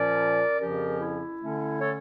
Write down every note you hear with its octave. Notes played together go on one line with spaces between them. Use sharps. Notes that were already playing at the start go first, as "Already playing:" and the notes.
Already playing: A#2 F3 C#4 A#4 D5
F2 C#3 F3 C#4 G4 A#4
E4
D3 A3 C#4
A4 C#5